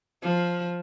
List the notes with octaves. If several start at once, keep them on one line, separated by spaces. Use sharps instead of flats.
F3